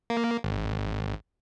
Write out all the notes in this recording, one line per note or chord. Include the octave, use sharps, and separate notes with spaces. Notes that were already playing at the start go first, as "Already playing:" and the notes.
A#3
G#1